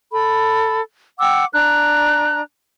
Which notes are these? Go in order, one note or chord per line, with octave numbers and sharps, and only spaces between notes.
A4 B5
F#5 G5 D6 E6
D4 A#5 F#6